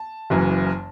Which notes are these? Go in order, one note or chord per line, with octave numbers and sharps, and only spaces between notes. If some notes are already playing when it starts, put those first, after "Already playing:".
Already playing: A5
F#1 F#2 E3